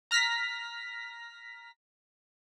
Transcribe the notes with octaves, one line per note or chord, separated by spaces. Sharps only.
A#5 F6 A#6 B6